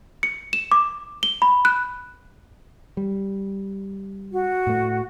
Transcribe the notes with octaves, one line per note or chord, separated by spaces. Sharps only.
C#7
E7
D6
G7
B5
F#6
G3
F#4
A2 A3